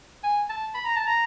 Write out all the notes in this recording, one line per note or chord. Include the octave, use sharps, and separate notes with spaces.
G#5
A5
B5
A#5
A5
A#5